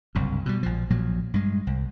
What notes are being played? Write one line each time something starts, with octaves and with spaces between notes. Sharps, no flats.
F#1 C2 G2
B2 F#3 G3
A#1 F3
A#1 A#2 F3 F#3
G2 G#3
C2